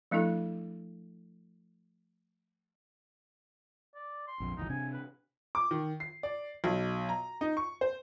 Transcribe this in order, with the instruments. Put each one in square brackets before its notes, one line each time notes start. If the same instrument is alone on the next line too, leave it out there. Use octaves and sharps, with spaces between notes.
[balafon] F3 A3 D4 E4 A4
[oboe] D5
C6
[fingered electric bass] A#1 F2
[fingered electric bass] G1 C#2 E3 [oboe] D#4
[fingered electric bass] C3 C4 D4 [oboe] G#5
[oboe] B4
[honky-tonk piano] D6
D#3
C7
D5
B1
A#5
D#4
C#6
C5